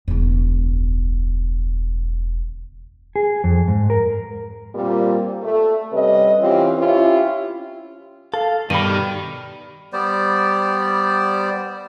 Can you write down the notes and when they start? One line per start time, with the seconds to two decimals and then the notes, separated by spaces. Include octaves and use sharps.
0.08 E1 C#2
3.16 G#4
3.44 F2
3.68 G#2
3.90 A#4
4.75 A#2 G3 A#3 C4 F4
5.42 A3
5.92 C3 G3 C#4 B4 D#5
6.40 E3 C4 C#4 F4 G4
6.78 C#4 E4 F4 G4
8.34 A4 F5
8.70 G2 B2 D#3 G3 B5 D#7
9.93 G3 B3 C5 D5